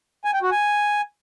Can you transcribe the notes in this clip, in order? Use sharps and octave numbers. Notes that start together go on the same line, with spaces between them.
G#5
G5
F#4
G#5